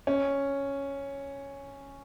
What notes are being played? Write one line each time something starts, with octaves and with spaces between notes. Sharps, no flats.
C#4